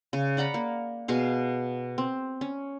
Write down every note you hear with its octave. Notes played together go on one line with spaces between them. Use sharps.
C#3
D5 F#5 A#5 B5
A#3
B2 G#4 F5
C4
C#4